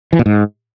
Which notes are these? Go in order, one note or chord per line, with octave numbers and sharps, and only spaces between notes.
E3
A#2
G#2